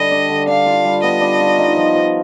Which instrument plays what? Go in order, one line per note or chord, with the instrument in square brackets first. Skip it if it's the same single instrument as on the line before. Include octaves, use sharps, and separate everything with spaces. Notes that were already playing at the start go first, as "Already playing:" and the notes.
Already playing: [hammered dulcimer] D3 G3 [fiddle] D#5
[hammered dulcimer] D4
D3
[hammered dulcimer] D4 [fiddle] F5
[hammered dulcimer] F4
G3
[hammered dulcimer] B3 [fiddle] D#5
[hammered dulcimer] D4
F4
D#4
F3
F3